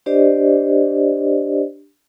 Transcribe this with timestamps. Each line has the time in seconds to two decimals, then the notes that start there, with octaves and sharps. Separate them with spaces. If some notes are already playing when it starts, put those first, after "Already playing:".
0.06 D4 G4 C5 D5 D#5